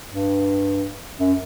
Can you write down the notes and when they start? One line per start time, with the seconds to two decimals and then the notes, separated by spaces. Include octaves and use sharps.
0.10 G2
1.18 F#2